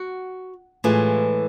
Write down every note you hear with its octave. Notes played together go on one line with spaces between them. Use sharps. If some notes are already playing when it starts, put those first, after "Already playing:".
Already playing: F#4
A2 E3 G#3 F4